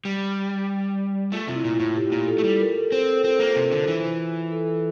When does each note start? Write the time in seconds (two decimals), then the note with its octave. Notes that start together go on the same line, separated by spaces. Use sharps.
0.05 G3
1.32 A3 F4
1.48 C3 F4
1.54 E4
1.64 A#2
1.75 A2 F4
1.96 G4
2.12 A#2
2.28 A4
2.38 A3
2.44 G3
2.60 A#4
2.76 A4
2.92 C4 C5
3.08 A4
3.24 C4 F4
3.40 A#3
3.56 C3
3.72 D3
3.87 E3
4.52 A4
4.68 A4